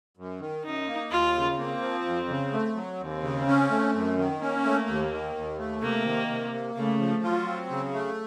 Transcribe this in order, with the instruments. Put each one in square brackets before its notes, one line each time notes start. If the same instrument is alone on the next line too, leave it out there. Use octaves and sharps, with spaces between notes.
[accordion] F#2
D#3
[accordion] F#2 [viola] D#4
[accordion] A#3
[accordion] D#2 [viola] F4
[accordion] C#3
[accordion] A#3 [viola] C4
[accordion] F3
F2
C#3
A3
F#3
[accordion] D#2 [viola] C4
[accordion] C#3
C#4
A3
F#2
D#3
[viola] A#3 [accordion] C#4
[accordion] A3
D#2
D#3
D#2
A3
[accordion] C3 [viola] A#3
[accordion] D#3
C3
A#3
[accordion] C#3 [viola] A3
[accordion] F3
[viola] F#3 [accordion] F4
[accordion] C4
C#3
A3